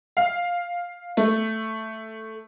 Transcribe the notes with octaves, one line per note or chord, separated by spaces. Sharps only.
F5
A3